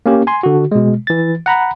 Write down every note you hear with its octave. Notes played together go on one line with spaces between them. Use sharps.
A#3 C#4 G4
G#5 C6
D3 F#4
B2 G#3
E3 A6
F#5 A#5 B5